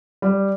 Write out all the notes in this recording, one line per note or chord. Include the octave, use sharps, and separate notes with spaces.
G3